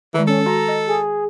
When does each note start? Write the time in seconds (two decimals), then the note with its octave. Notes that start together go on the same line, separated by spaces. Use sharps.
0.14 D#3 E3 G#3
0.28 C#4 A4
0.46 F#4 A#5
0.68 D#5
0.87 G#4